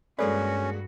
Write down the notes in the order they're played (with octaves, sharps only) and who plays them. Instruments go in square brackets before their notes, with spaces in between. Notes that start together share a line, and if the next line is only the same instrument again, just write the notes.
[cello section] G2 F#4 [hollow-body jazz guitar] G#3 A#3 B4 [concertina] C#4 [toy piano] A4 D5